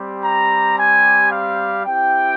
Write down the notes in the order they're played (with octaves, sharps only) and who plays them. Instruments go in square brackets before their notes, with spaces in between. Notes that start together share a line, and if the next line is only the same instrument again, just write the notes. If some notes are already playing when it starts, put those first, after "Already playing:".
Already playing: [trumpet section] G3 C4 G4
A#5
G#5
F5
C4 E4 G4 G5